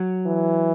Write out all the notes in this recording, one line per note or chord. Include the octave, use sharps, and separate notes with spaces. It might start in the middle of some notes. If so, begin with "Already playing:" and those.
Already playing: F#3
E3